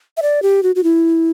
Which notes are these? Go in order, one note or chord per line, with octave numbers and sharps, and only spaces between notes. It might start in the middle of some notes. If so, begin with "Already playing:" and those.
E5
D5
G4
F#4
F#4
E4